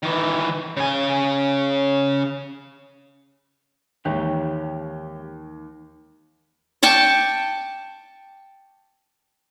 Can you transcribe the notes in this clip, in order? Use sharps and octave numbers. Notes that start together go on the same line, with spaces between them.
D#3 E3
C#3 G#5
D#2 G#2 D#3 E3 G#3 G4 C#5
G5 A5 C#6 D6